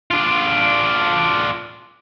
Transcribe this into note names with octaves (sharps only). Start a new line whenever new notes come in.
D4 F4